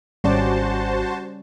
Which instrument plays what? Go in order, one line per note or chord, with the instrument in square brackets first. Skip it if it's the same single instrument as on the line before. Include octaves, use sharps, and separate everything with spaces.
[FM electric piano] G#1 [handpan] G3 C#4 D5 [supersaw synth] F#4 C5 A5